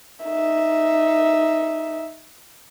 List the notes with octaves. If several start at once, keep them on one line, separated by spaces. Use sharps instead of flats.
D#4 E5